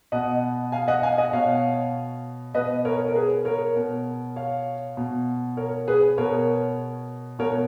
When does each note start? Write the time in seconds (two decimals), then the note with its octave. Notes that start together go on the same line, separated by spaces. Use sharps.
0.12 B2 D#5 F#5
0.72 F5 G#5
0.88 D#5 F#5
1.03 F5 G#5
1.18 D#5 F#5
1.33 B2 C#5 F5
2.54 B2 B4 D#5
2.85 A#4 C#5
3.08 A#4
3.15 G#4 B4
3.45 A#4 C#5
3.76 B2
4.36 C#5 F5
4.97 B2
5.57 A#4 C#5
5.88 G#4 B4
6.18 B2 A#4 C#5
7.39 B2 A#4 C#5